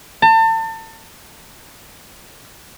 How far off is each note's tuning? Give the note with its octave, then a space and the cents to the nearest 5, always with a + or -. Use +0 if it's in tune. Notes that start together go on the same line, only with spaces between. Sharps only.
A5 +35